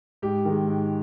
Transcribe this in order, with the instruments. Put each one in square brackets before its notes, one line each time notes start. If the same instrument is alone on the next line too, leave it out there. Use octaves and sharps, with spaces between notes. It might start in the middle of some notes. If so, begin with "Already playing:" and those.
[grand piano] G#2 G4
D#3 G#3
G#2